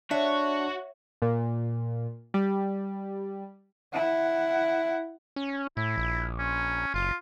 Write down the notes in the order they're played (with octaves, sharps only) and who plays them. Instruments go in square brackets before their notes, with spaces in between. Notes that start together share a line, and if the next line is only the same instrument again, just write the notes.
[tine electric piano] D4 [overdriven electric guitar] F#4 [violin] C#5 [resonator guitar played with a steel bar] E5
[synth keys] A#2
G3
[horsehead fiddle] E4 F#5
[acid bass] C#4
[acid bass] A2 [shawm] E4
[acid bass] A#1
[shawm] C#4
[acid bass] F#1 [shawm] F4